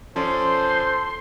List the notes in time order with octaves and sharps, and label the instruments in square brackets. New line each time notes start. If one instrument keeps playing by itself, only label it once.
[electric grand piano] F3 C#4 D5 [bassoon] A4 [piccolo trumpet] C5 [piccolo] C6